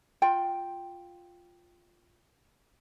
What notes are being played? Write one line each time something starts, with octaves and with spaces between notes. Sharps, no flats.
F4 G5